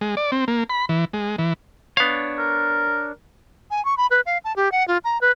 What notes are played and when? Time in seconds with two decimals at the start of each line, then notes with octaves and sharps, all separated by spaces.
0.01 G#3
0.17 D5
0.32 C4
0.48 A#3
0.70 B5
0.89 E3
1.13 G#3
1.38 E3
1.97 B3 D4 C#5 F5
2.38 A#4
3.71 G#5
3.85 C#6
3.97 B5
4.11 B4
4.26 F5
4.44 A5
4.56 G4
4.72 F#5
4.88 F4
5.04 A#5
5.21 B4